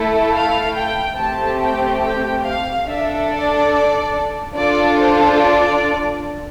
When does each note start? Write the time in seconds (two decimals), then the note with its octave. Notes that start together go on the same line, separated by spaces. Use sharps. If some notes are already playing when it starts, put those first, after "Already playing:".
Already playing: A3 E4 A4
0.33 F5
0.75 G5
1.17 A3 C4 G4 A5
1.59 G5
2.01 G5
2.44 F5
2.86 D4 A4 E5
3.28 D5
4.54 D4 F4 A4 D5
4.96 C5
5.39 D5